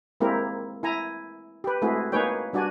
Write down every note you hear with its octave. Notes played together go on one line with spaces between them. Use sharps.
G#3 A#3 C4 E4 G4 A#4
E4 G#5 A#5
G4 B4
G#3 A3 C4 E4 F#4 G#4
A#3 D#4 G#4 B4 C#5 G5
G3 D4 F#4 D5 G#5